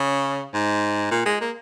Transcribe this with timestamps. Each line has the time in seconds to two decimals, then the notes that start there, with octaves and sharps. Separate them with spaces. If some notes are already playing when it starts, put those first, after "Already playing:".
Already playing: C#3
0.54 G#2
1.11 A#2
1.26 G#3
1.41 A#3